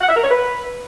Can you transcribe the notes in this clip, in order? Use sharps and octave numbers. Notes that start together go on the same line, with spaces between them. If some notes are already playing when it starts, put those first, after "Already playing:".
F#5
E5
A#4
C#5
B4